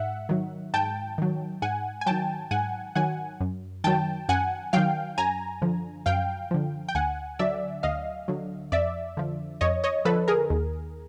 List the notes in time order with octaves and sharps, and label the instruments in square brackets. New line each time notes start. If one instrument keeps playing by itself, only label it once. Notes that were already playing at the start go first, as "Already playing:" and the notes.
Already playing: [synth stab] G#2 E5 F#5
D#3 F#3
G#2 G5 A5
D#3 F#3
G#2 F#5 G#5
G#5
D#3 F#3 G5 A5
G#2 F#5 G#5
D#3 F#3 F#5 G#5
F#2
D#3 F#3 G5 A5
F#2 F#5 G#5
D#3 F#3 F5 G5
F#2 G#5 A#5
D3 F3
F#2 F5 G5
D3 F3
G5
D2 F#5 G#5
D3 F#3 D5 E5
D2 D#5 F5
D3 F#3
F2 D5 E5
D3 F3
F2 C#5 D#5
C#5 D#5
D3 F3 A4 B4
G#4 A#4
D#2